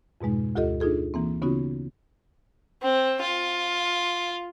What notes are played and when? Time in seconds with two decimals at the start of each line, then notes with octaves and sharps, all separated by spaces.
0.21 F2 G#2 B2 G#3 D#4
0.55 D2 F4 G4 A4 D#5
0.80 D4 D#4 F4 G#4 A4
1.14 E3 A#3 C4
1.42 C#3 B3 C#4 D#4 F4 F#4
2.82 C4
3.21 F4